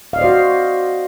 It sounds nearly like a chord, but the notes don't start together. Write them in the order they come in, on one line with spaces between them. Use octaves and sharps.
F5 D#5 D5 C5 F#4